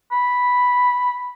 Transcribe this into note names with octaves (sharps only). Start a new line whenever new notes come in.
B5